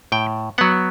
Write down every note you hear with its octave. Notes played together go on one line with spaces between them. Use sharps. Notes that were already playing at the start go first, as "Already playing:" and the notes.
A2 G5
F#3 B3 F#5